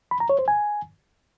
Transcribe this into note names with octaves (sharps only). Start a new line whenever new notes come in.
B5
A#5
C#5
C5
G#5